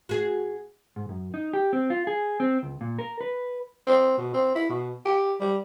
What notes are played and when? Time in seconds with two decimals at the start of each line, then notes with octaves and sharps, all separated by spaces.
0.09 F#4 G#4
0.96 G#2
1.09 F#2
1.34 D#4
1.53 G4
1.73 C4
1.90 F4
2.07 G#4
2.40 C4
2.63 C#2
2.81 A#2
2.99 A#4
3.21 B4
3.87 C4
4.18 B2
4.33 C4
4.55 E4
4.70 B2
5.05 G4
5.40 G3